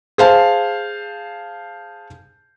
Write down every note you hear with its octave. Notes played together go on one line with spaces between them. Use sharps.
G#4 C5 F5 A5